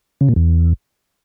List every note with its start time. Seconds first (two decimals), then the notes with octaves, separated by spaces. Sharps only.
0.21 C#3
0.28 A#2
0.36 E2